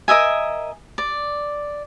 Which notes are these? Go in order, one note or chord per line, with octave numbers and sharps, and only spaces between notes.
A#4 D#5 E5 G#5
D5